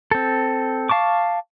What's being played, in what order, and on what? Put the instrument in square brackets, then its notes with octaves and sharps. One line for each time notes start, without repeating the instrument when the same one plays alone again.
[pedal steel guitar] C4 A4
F5 A5 C#6 D6